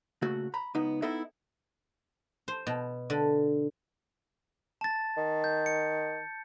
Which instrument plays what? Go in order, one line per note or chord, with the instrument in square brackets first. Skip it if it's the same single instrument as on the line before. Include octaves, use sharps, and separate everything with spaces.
[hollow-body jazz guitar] A#2 C#3 A3 F#4
A#5 B5
C#2 B3 D#4
B3 D#4 E4 A4 D#5 E5
[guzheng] C5
B2
D3
[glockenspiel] A5 A6
[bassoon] D#3
[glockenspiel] G6
C#7